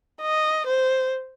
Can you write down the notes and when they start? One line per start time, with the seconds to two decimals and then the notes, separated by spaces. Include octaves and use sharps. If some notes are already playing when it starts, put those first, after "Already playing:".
0.22 D#5
0.67 C5